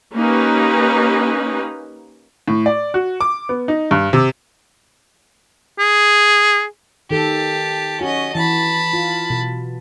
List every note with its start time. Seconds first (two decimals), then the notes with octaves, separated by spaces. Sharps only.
0.14 A#3 C#4 D#4 G4 B4
2.48 A2
2.66 D5
2.94 F#4
3.21 D6
3.49 B3
3.68 D#4
3.91 G2
4.13 C3
5.79 G#4
7.11 D#3 G4 A4 A5
8.01 C#4 F#4 D#5
8.35 E3 A5 B5
8.93 F4
9.30 B2